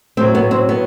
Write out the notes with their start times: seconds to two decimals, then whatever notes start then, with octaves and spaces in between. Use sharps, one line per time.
0.17 A2 F#3 C4
0.35 B3
0.51 C4
0.69 B3